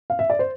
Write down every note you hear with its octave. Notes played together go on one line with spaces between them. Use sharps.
F5
E5
D5
C5